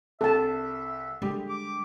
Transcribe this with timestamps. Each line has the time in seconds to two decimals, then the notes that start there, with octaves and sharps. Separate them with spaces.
0.21 C2 A4 E5 A5
1.22 D3 G3 G#3 G4
1.49 D6